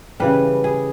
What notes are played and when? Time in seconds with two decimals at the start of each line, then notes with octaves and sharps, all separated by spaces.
0.20 C#3 E3 G3 B4
0.64 G#4